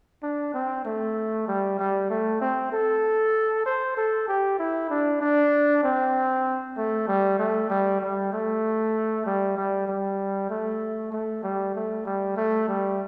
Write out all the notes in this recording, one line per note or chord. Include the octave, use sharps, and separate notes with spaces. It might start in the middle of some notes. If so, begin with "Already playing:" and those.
D4
C4
A3
G3
G3
A3
C4
A4
C5
A4
G4
E4
D4
D4
C4
A3
G3
A3
G3
G3
A3
G3
G3
G3
A3
A3
G3
A3
G3
A3
G3